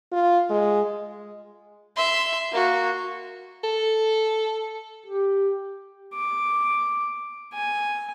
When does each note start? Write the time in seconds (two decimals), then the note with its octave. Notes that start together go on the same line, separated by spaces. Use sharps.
0.12 F4
0.50 G#3
1.96 E5 C6
2.52 A#3 F#4
3.64 A4
5.06 G4
6.15 D6
7.54 G#5